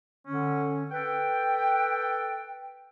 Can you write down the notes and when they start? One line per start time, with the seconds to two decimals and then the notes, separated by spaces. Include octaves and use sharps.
0.27 D3 C#4
0.91 A4 B4 G5